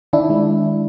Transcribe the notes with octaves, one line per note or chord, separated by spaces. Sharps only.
D#3 D4 E4
G#3